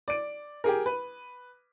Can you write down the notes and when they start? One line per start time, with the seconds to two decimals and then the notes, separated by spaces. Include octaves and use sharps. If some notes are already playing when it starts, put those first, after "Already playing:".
0.08 D5 D7
0.64 G4 G#4 A#4
0.86 B4